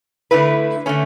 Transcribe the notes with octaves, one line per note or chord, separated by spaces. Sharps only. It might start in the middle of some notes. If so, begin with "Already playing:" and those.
D3 A3 E4 B4
D3 A3 C#4